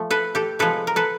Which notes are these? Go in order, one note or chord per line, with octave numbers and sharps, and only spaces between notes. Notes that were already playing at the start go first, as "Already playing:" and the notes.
Already playing: F3 A3
A4 B4
G4 A4
C3 F3 G#3 A4 B4
A#4
A4 B4